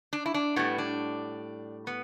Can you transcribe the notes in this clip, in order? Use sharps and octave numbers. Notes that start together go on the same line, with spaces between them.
D4
E4
D4
A2 G3 B3
D4
B3